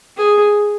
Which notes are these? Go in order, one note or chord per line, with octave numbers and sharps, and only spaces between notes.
G#4